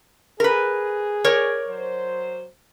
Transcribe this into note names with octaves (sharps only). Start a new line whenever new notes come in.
G#4 A#4 B4
A#4 C#5 D5
F#3 C5